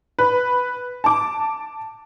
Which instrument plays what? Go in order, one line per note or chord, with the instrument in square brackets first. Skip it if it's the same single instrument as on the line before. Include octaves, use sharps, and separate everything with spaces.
[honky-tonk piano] B4
A5 D6